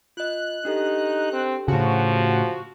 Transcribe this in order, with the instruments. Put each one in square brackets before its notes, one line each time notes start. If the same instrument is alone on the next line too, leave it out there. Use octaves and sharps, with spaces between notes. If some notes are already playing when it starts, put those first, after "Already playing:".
[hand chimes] F4 D#5 [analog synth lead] F#6
[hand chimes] D4 G4 A4 [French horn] D#4
[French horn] C4
[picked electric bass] A2 C#3 [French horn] F3 [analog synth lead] F#4